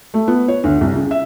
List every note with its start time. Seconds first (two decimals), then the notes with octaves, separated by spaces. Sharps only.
0.14 A3
0.28 B3
0.48 C#5
0.64 D2
0.81 C2
0.95 C#3
1.11 E5